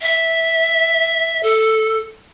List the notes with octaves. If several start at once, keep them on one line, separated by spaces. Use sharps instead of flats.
E5
A4